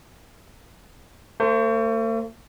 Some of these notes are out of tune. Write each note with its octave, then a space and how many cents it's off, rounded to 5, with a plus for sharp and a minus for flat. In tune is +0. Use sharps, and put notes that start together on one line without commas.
A3 +45 C5 +0